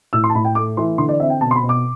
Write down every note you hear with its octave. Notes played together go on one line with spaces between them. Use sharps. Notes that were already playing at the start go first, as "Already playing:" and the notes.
A2 E6
C6
A5
A2 B5
G5
A3 D6
E3 C6
D3 C6
D5
C4 E5
G5
B2 A5
C6
B5
B2
D6